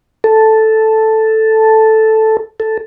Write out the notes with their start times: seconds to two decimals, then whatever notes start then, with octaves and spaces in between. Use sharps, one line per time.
0.24 A4
2.60 A4